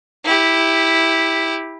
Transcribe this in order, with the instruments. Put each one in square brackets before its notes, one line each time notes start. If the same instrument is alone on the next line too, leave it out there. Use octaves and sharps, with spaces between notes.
[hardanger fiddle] E4 G4